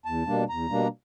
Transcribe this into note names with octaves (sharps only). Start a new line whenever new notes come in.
E2 A5
B2 G3 A#3 D4
E2 A#5
B2 G3 A#3 D4